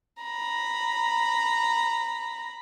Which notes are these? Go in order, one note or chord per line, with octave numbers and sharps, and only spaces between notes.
A#5 B5